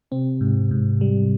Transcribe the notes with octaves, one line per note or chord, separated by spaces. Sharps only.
C3 C4
G#2
G#2
G3